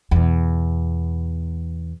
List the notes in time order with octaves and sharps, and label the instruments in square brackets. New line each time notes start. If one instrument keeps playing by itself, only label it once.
[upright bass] E2 B2